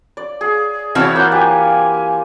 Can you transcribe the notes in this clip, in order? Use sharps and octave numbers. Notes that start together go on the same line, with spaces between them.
D5
G#4
E3 C4 F#4 C#5 A5 F6
A#3 F4 F#5 G6
G4 G#5